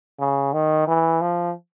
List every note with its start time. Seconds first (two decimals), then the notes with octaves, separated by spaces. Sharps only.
0.20 C#3
0.53 D#3
0.88 E3
1.21 F3